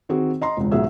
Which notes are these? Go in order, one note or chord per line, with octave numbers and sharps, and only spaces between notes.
D#3 C4 F#4 G#4
D#5 A#5 C6
E1 C#2
B1 G#2 F#4 G#4 E5 E6